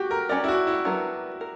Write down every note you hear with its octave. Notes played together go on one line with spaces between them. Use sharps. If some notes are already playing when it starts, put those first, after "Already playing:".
Already playing: F#4 G4
A#4
C#4 G4 A#4 D5
E4
F#4
E4
F#3 B3 D4 A#4
A#4